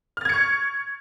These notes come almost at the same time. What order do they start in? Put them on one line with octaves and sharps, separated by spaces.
F6 A6 G#6 C#7 C#6